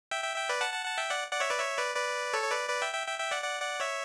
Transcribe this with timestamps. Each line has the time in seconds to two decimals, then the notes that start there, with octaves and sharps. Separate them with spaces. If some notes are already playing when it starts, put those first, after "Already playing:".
0.11 E5 G5
0.24 E5 G5
0.36 E5 G5
0.49 B4 D5
0.61 F#5 A5
0.73 F#5 A5
0.85 F#5 A5
0.98 E5 G5
1.10 D5 F#5
1.32 D5 F#5
1.40 C#5 E5
1.50 B4 D5
1.59 C#5 E5
1.77 B4 D5
1.96 B4 D5
2.33 A4 C#5
2.44 C#5
2.51 B4 D5
2.69 B4 D5
2.82 E5 G5
2.94 E5 G5
3.07 E5 G5
3.18 E5 G5
3.31 D5 F#5
3.43 D5 F#5
3.61 D5 F#5
3.80 C#5 E5